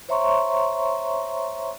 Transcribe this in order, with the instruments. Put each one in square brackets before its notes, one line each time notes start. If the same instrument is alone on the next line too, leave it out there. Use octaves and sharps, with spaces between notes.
[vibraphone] C5 C#5 E5 A#5 C6 C#6